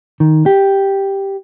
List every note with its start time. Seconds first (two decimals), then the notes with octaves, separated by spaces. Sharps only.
0.20 D#3
0.46 G4